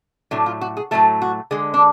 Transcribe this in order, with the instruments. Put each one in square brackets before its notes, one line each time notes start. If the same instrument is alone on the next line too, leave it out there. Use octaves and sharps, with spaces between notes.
[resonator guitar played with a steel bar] A2 F#3 A3 D4
F4
F#4
G#4
A2 F#3 A3 A4
F#4
D3 G#3 G#4
D4